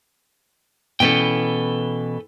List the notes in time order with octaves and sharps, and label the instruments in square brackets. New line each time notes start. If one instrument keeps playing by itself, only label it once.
[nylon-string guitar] B2 E3 C#4 [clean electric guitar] A4 B4 G5